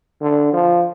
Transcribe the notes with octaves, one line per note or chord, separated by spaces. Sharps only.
D3
F3